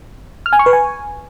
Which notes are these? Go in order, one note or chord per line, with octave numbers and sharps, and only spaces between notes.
F6
G#5
C#6
B4
G#5